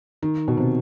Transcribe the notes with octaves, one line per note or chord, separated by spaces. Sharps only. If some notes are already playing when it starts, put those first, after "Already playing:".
D#3
B2
C3